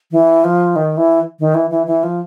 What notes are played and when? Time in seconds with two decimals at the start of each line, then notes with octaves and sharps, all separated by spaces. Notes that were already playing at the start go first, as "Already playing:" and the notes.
0.12 E3
0.44 F3
0.76 D#3
0.97 E3
1.40 D#3
1.54 E3
1.70 E3
1.87 E3
2.03 F3